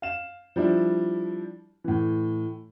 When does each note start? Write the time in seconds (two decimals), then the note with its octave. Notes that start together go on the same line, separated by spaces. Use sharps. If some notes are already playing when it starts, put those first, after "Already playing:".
0.02 F5 E7
0.56 F3 G3 D4 E4
1.84 A2 E3